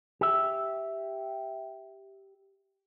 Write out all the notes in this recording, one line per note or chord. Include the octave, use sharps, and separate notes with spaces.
G4 E5